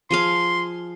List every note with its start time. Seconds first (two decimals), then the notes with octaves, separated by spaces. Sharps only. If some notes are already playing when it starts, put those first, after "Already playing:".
0.11 F3 G#4 F5 C6